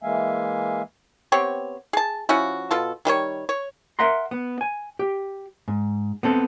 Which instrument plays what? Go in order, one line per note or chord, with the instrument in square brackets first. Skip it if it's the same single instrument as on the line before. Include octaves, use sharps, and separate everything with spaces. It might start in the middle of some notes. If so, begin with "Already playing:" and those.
[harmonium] E3 G#3 A#3 E5 F5 G#5
[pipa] B3 C4 G4 C#5
G#4 A5
F3 C#4 E4 F#4
B2 F4 A4
D#3 G3 G4 C#5
C#5
[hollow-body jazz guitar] A#4 E5 F#5 A#5 C6
B3
G#5
G4
G#2
B3 C4 A4